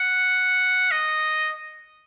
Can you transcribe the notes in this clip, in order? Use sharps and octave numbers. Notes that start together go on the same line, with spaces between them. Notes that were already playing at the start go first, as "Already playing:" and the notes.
Already playing: F#5
D#5